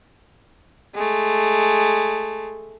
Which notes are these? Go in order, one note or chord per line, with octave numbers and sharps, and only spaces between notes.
G#3 A3